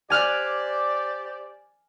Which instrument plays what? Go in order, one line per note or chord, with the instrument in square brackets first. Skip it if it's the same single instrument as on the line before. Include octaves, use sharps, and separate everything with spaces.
[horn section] G4 C5 D5 [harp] G#5 F6 F#6